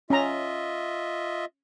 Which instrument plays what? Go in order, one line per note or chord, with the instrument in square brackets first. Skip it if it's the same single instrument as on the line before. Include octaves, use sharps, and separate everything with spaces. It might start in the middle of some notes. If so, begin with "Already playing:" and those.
[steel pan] C#4 A#5 [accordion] F4 D#5 E5